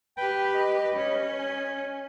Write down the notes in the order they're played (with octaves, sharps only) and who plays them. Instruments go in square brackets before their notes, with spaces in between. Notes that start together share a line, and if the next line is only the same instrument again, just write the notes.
[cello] G4 B4 [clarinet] G5
[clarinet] D#5
[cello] C#4
[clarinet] G#5